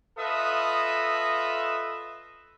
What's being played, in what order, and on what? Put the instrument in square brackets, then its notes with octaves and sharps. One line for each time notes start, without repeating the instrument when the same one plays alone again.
[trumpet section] F4 A4 B4 D#5 E5 D#6